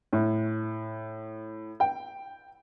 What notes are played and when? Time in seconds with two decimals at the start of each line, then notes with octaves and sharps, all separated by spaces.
0.13 A2
1.80 G5